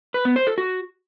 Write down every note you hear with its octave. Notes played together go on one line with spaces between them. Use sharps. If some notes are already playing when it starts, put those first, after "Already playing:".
B4
B3
C5
A4
F#4